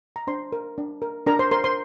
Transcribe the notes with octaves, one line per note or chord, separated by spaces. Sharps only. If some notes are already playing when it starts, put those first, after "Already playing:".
A#5
D4 C5 C6
A#4
D4
A#4
D4 A#4 A#5
C5 C6
A#4 C5 C6
C5 C6